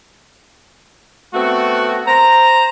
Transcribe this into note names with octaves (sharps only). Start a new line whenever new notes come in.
A3 B3 C4 F#4
C5 A#5